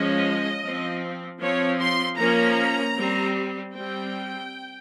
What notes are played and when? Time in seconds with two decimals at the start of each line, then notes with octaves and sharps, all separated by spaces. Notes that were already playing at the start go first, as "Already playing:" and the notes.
Already playing: F3 G#3 C#4 D#5
0.62 F3 C4
1.39 F3 C4 C#5
1.79 C6
2.17 F3 A#3 C#4 A#5
2.96 G3 C4
3.73 G3 C4 G5